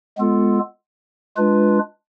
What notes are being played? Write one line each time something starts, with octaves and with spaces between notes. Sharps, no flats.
G#3 B3 F4 A4
G#3 D4 F4 B4